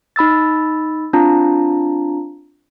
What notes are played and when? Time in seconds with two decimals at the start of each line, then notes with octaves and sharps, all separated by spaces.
0.16 D#4 B5 E6 A6
1.13 C4 D4 F4 A5 A#5